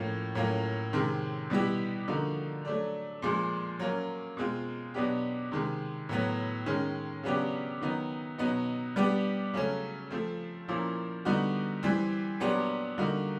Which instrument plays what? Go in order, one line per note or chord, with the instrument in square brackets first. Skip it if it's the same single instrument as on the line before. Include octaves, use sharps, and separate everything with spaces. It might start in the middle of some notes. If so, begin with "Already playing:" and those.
Already playing: [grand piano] A2 F3 A#3 C#4
A2 F#3 A#3 C#4 F4
C3 D#3 G#3 C4
B2 G3 B3 E4 G4
D3 F3 A#3 D#4 F#4
F#3 A3 D4
A#2 F3 G#3
F#3 A#3 C#4
B2 G#3 C4 F4
B2 F#3 B3 D4 G4
C3 D#3 G#3
A2 F#3 B3
D#3 G#3 C#4
C#3 F#3 B3 D4 G4
D#3 F#3 B3 D#4
B2 F#3 B3 D#4
G3 B3 D4 G4
C#3 F#3 A3 C#4
F3 A3 C4
A#2 F3 A#3 C#4 E4
D3 G3 B3 D#4 F#4
E3 G3 C4
A#2 F#3 B3 D4 G4
D3 G3 A#3 D#4 F#4